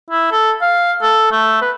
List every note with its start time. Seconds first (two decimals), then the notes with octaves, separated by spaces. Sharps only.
0.10 E4
0.32 A4
0.61 F5
1.02 A4
1.32 A3
1.62 B4